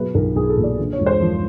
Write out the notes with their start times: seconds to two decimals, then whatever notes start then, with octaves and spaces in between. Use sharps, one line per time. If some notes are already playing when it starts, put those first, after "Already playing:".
Already playing: B2 F#3 B4
0.15 B1 A#4
0.36 B1 G#4
0.50 A4
0.57 A#2
0.63 D5
0.78 D3
0.93 C#5
0.99 E1
1.06 C5
1.21 F3